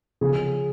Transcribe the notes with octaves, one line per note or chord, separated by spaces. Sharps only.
C#3 F3 G#4